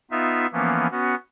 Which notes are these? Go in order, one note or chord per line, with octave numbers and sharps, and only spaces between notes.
B3 D#4 F4 E5
E3 F3 A#3 B3 C#4
B3 C#4 F#4